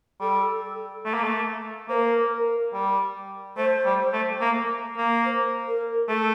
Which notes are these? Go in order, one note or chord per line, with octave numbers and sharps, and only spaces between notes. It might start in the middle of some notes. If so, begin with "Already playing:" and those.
G3 A4
A3
A#3
A3
A#3 A#4 C5
G3
A3 C5
G3
A3
A#3
A#3
C5
A#4
A3 A4